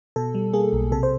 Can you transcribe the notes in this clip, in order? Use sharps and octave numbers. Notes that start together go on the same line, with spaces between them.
B2 A4
G3
A#3 G#4
B1
C3 A4
C5